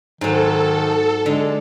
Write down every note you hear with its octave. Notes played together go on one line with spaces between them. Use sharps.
G#2 D#3 F#3 A4
D3 G#3